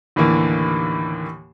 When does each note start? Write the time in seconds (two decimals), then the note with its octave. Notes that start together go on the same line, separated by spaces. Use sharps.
0.16 D#2 A2 D3 E3 A#3